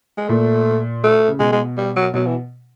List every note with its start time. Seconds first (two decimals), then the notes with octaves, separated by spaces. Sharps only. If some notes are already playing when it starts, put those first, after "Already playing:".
0.18 G#3
0.29 A#2 A3
1.04 A3
1.28 C#3
1.39 B2 G#3
1.52 G#3
1.77 G3
1.96 F#3
2.14 B2 F#3
2.26 E3